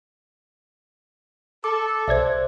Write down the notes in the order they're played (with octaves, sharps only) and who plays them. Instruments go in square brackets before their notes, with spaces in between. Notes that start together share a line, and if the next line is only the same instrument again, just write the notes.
[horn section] A4 [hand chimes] D6
[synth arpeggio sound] B1 D5 G#6 [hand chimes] C5 E5